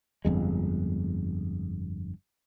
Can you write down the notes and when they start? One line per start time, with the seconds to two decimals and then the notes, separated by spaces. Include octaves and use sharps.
0.25 G1 F2 G#3